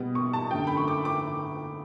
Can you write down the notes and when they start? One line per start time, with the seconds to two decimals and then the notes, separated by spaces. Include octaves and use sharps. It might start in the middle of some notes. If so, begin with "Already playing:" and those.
Already playing: B2 G3 B3
0.15 C#6
0.33 A5
0.51 F#2 D3 A3 G5
0.67 B5
0.77 C#6
0.88 D6
1.05 D6